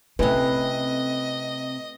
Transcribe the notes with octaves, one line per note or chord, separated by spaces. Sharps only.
C3 A3 C4 C#4 E4 B4 D#5